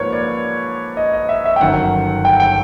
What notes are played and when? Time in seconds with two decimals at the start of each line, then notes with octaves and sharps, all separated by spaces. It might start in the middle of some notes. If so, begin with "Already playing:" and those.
Already playing: G#2 F3 A#3 B4 C#5
0.13 D5
0.97 D#5
1.13 D#5
1.29 E5
1.45 E5
1.56 G5
1.61 G1 F#2 D#3 F#5
2.25 G5
2.40 G5